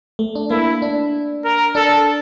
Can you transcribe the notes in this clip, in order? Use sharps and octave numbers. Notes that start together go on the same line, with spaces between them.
A3
D4
A#3 E4
D4
A#4
D4 A4